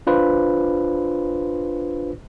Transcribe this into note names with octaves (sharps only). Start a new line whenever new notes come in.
D4 F4 B4 C5